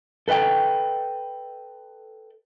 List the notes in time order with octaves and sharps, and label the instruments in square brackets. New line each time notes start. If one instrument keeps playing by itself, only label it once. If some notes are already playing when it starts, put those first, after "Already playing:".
[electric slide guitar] A4 B4 D#5 G5